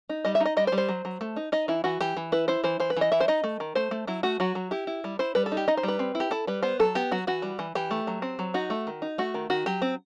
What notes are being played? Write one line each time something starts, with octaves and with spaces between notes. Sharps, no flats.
D#4
G3 D#5
E5
D#4
D#5
G3 D#5
C5
G3
C5
F#3
F#3
A3
D#4
D#4 D#5
E3 E4
E3 F#4
E3 G4
E3
E4 B4
E4 C5
E3 C5
E3 C5
B4
E3 D#5
E3 E5
C5
D#4 D#5
A3
D#3
A3 C5
A3
F#3 E4
A3 F#4
F#3 F#4
F#3
E4 G4
E4
G3
E4 C5
G3 B4
A4
D#4
G4
D#4 D#5
C5
G3 B4
C4
E4
G4
E4 A4
G3 B4
B3 C5
F#3 A4
B3 G4
F#3 F#4
E3 F#4
G3
E3
E3 G4
A3
F#3
C4
F#3
D#4 F#4
A3
D#3
D#4
A3 F#4
D#3
D#3 F#4
F#3 G4
C4